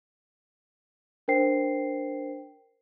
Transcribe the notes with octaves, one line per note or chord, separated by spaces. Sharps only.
D4 A#4 C5 G5 C7